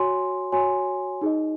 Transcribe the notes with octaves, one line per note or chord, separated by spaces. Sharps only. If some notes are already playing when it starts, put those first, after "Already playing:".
Already playing: F#4 C#5 G#5 C6
F#4 C#5 G#5 C6
D#4 G#4 D#5